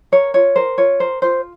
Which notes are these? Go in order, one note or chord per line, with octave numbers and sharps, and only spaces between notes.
A#4 C#5
F4 C#5
A#4 C5
F4 C#5
A#4 C5
F4 C5